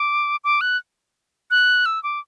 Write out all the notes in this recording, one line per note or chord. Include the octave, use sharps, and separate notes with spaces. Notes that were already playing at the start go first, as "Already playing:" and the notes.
Already playing: D6
D6
F#6
F#6
E6
D6